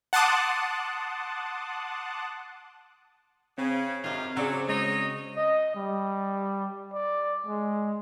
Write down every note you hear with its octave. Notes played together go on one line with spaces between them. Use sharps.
F#5 A5 C6 D6 D#6 F#6
C#3 C4
F#2 C3 D#4 F4 F#4
C#3 F#3 C4 G#4 D5 E6
G#3 D#4 C#5 D#5
D#5
G3
D5
G#3